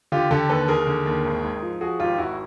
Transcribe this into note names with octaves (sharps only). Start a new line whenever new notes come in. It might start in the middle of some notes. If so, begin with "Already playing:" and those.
D3 F4 G4
D3 G4 A4
D#2 A4 B4
D#2 G#4 A#4
D3
D#2
G#1
G#2
F3
F3 F#4 G#4
G#1 F4 G4
G#1 E4 F#4